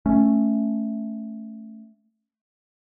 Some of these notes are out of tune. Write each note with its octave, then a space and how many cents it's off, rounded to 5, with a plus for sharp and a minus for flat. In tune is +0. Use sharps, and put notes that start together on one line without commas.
A3 +0 C#4 +0